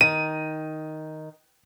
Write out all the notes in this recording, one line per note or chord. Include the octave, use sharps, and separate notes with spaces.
D#3 D#7